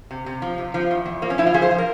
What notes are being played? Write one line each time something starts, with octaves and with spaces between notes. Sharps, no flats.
C3
C3
F3
C3
F3
E2
E2
F3 A#3
C#4
F3 E4
F4
F3 G#4
C5
F3
A#4